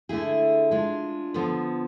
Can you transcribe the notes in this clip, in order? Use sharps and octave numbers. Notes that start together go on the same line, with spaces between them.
D3 A3 E4 G#4
G#3 D4 F4
D3 F3 B3